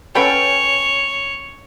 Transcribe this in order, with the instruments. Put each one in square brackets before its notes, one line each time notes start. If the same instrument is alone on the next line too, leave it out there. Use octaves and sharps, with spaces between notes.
[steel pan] C#4 A4 G5 [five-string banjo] B4 F#5 B5 [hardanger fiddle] C#5